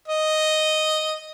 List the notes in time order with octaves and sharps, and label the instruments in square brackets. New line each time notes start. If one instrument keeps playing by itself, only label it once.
[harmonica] D#5